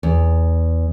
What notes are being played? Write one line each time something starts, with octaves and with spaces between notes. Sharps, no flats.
E2